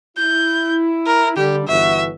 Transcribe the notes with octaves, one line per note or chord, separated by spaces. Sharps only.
E4 G6
A#4
D3 G3 G4
G1 E3 F#4 E5